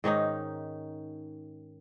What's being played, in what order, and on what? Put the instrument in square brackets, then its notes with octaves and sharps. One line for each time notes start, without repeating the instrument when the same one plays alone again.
[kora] G#2 D#3 C#4 D#4